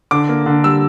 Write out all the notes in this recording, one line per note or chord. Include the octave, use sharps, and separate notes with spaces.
D3 D6
A#3
D3
G3 E6